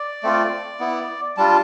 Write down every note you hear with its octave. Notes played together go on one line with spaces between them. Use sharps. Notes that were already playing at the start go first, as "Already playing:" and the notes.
Already playing: D5
A3 C4 F4
B3 E4
G3 D4 F4 A5